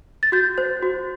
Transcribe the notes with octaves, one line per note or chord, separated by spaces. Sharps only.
A6
F#4 G6
C5
F#4